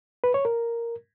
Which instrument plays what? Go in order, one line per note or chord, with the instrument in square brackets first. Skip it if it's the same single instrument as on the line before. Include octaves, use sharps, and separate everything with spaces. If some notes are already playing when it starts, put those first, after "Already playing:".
[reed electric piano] B4
C#5
A#4